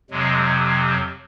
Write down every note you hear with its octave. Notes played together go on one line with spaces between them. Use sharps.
F2 C3 F#3 G#3